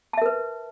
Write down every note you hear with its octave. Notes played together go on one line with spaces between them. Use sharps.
A#4 B4 E5 A5